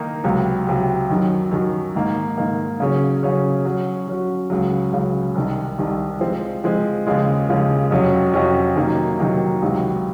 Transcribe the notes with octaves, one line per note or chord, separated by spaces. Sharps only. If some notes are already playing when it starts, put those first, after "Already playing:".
Already playing: D#3 A#3 D#4 A#4
C#2 C3 F#3
C#2 C3 F#3
F#2 D#3 F#3
F#2 D#3 F#3
G#2 D#3 A#3
G#2 D#3 A#3
C#3 F#3 C#4 G#4 C#5
C#3 F#3 C#4 G#4 C#5
F#3 C#4 F#4
F#3 C#4 F#4
C#2 C#3 F#3
C#2 C#3 F#3
C2 C3 D#3
C2 C3 D#3
F3 G#3 C4
F3 G#3 C4
D#2 C#3 F3 G#3
D#2 C#3 F3 G#3
F2 C3 F#3 C#4 F#4
F2 C3 F#3 C#4 F#4
C3 D#3 F#3 A#3 D#4
C3 D#3 F#3 A#3 D#4
C#2 C3 D#3 F#3